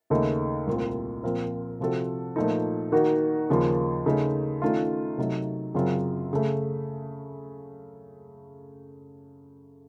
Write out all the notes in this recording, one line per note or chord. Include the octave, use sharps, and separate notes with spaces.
D#2 C#3 A3 D#4
C2 A#2 A3 C4 F4
A#2 F3 C4 F4 A#4
C3 F3 C4 F#4 A4
A#2 F3 A3 D#4
D#3 A#3 D#4 F#4
D#2 C#3 F3 A#3
C#3 A3 D#4
D#3 A3 C#4 F4 A#4
C3 F#3 A3 D#4
F#2 C#3 F#3 C4 F4
C#3 A3